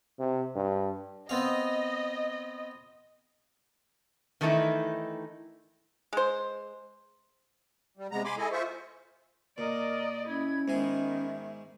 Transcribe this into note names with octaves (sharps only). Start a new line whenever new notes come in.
C3
G2
B3 C4 D#5 F5
D#3 E3 A3 D#4 E4
G#3 C5
G3
C3 G#3 B3 A#5
G#5 B5 C6 D6
E4 G#4 A4 D#5 G#5
F4 C5 E5 C#6
A#2 A#4 D5 D#5
C#4 E4 G#6
G#2 D#3 G#3 B3 E5 G#5